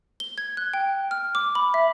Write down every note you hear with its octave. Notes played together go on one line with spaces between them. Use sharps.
G7
G#6
F#6
G5
F6
D6
B5
E5